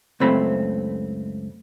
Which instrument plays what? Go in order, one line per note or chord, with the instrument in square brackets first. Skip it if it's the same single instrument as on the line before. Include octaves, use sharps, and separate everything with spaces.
[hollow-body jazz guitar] C#2 F#2 A3 C4 B5